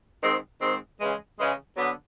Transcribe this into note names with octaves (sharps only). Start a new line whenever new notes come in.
G#2 D#3 G#3 C4
G#2 D#3 G#3 C4
C#3 E3 G#3
C#3 E3 G#3
D3 F#3 B3